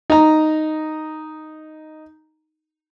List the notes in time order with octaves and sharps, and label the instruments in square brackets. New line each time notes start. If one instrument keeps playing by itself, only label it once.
[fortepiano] D#4 A#5